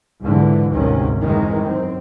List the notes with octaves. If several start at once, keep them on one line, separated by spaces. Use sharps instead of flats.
C#2 G#2 B2 D3 E3
G#1 D2 G#2 C3 D#3 C#4
F2 D#3 E3 G#3
F#2 C4